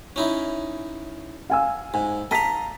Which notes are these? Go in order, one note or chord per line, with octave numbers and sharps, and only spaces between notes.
C#4 D#4 E4
F5 G#5 E6
G#2 G#5
D#5 F5 A5 A#5 B6